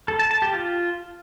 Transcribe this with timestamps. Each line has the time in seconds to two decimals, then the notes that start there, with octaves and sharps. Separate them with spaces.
0.08 A4
0.19 A5
0.31 A5
0.42 G4
0.53 F4